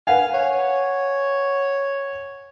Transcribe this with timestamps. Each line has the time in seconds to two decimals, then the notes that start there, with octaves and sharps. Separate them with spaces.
0.07 B4 F5 F#5 G#5
0.34 C#5